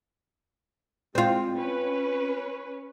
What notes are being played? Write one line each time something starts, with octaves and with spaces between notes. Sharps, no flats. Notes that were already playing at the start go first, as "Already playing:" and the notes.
G#3 C4 F4
C#4 B4